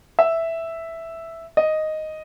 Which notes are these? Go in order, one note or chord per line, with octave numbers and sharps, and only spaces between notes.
E5
D#5